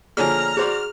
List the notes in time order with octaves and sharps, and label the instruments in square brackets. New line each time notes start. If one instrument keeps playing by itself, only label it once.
[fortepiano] A#2 D3 F3 [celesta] G#4 C#5 G#5 [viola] A#5 [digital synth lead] F6
[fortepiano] F#4 C5 D5 [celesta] G#4